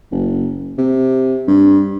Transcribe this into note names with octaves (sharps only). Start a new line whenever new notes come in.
F#1
C3
G2